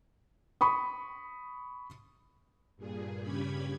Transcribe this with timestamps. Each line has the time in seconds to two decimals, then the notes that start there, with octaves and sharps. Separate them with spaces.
0.61 B5 C#6 D#6
2.77 G2 A#2 G#4
3.21 G2 C#3 C#4 G4 B5 G#6